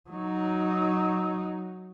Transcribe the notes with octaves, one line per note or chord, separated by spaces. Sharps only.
F#3 D#4